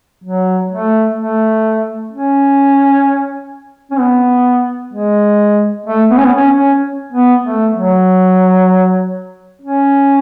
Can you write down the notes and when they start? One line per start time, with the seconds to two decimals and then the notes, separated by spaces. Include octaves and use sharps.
0.24 F#3
0.70 A3
1.17 A3
2.11 C#4
3.91 C#4
4.00 B3
4.93 G#3
5.86 A3
6.11 B3
6.17 C#4
6.25 B3
6.34 C#4
6.57 C#4
7.13 B3
7.44 A3
7.75 F#3
9.62 C#4